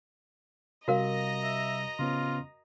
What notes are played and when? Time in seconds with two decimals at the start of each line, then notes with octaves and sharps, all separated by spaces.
0.88 C3 G3 F#4 A#4 D#5 F5 A#5
1.43 E5
1.99 C#3 B3 C#4 F4